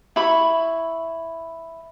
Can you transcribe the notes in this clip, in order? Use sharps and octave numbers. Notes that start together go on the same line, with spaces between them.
E4 B5 C#6